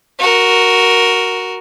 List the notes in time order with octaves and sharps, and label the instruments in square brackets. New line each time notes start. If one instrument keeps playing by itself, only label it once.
[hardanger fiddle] F#4 A#4